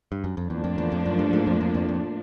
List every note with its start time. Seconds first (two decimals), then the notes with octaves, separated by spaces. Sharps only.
0.12 G2
0.24 F#2
0.37 F2
0.50 E2 A2 F3 A#3 D4
0.64 F2
0.78 E2
0.92 F2
1.06 F#2
1.19 G2
1.33 G#2
1.47 F2
1.61 F2
1.74 F2
1.89 F2